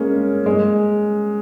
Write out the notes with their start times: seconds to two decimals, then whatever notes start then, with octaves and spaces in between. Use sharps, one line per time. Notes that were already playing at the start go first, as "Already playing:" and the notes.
Already playing: G#3 A#3 C#4
0.46 G#3